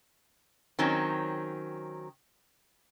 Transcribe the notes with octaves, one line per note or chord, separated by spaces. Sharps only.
D#3 F#3 C4 C#4